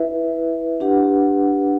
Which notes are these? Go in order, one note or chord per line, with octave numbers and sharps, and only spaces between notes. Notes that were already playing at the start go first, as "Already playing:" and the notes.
Already playing: E4 B4 E5
D4 G4 B4 F#5